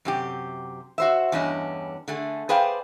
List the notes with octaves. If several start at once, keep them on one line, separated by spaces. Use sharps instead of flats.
F#2 C3 G4
F#4 C5 E5
E2 G2 C#4 D4 D#5
D3 A3 G#4
G#4 B4 C5 D5 F5 G5